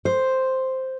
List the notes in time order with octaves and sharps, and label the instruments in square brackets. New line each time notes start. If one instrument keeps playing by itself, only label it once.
[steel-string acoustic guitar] C5